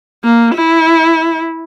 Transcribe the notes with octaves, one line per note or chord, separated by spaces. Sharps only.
A#3
E4